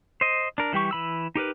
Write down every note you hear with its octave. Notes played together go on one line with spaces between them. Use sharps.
C5 D#5
D4 A#4
E3 G3 G4 C#6
E3 B5 E6
D#4 G4 A#4 B4